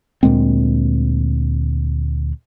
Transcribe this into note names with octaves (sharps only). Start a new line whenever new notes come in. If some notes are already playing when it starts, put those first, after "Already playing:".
D2 A#2 G#3 C4